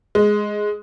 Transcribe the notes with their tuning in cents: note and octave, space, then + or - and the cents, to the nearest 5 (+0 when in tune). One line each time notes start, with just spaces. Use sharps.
G#3 +5